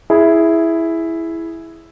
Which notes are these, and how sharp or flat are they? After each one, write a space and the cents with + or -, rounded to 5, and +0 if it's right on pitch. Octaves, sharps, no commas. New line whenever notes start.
E4 +0 G#4 +0